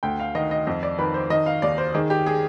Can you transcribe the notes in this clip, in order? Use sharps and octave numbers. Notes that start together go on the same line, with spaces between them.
D2 G5
F5
D#3 D#5
D#5
F2 D#5
D5
D#3 B4
C5
D#3 D#5
F5
D#2 D5
C5
D#3 G#4
G4
G#4